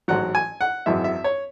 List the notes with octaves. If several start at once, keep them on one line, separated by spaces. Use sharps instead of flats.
A1 G#2 F#3 F#5
G#5
F#5
G#1 F#2 E3 E5
E5
C#5